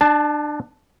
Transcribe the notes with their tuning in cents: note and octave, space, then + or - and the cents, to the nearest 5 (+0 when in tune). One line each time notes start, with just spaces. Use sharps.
D4 +25 A5 -10